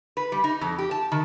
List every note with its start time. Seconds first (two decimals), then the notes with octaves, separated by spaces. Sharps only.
0.17 B4
0.32 G3
0.44 D#4
0.61 F2
0.78 G4
0.91 A5
1.12 D#3